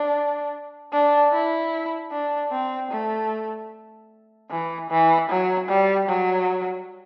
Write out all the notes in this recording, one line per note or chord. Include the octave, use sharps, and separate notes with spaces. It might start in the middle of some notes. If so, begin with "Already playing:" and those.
Already playing: D4
D4
E4
D4
C4
A3
E3
E3
F#3
G3
F#3